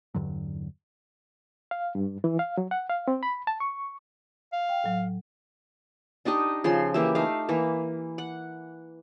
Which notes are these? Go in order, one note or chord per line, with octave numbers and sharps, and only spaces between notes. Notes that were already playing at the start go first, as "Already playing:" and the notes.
E2 G2 D3 F#3
F5
G2
E3
F5
F#3
F#5
F5
C4
B5
A5
C#6
F5
G5
A2 F#3
D4 D#4 G4 D#5
C#3 F3 C6
E3 A#3 G4 E5
A3 D#4 F5
E3 A#3
F#5